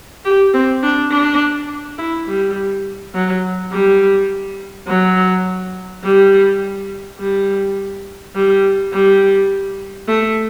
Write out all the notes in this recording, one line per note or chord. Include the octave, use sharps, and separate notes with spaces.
G4
C4
D4
D4
E4
G3
F#3
G3
F#3
G3
G3
G3
G3
A3